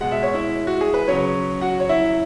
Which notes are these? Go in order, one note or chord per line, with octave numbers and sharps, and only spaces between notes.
B2 G#3 F#5
E5
C#5
E4 E5
F#4
G#4
B4
C#3 F#3 C#4 C#5
F#4 F#5
C#5
E4 E5